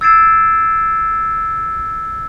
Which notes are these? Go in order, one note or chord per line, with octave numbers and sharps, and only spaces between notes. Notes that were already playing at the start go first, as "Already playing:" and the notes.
E6 G#6 A6 C7 D7 E7